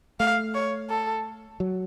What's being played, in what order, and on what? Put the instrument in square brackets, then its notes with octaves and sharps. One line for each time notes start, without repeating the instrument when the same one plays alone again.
[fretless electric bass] A3 [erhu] F5
[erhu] C#5
A4
[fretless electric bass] F#3